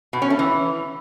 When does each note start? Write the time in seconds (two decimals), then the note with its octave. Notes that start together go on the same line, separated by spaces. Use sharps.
0.13 B2
0.22 C#4
0.30 A3
0.39 E3